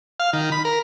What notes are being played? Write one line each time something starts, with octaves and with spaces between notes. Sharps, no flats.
F5
D#3
B5
A#4